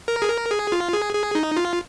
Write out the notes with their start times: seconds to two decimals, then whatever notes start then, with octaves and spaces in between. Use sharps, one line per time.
0.08 A#4
0.22 G#4
0.29 A#4
0.51 G#4
0.72 F4
0.93 G#4
1.15 G#4
1.35 D#4
1.57 F4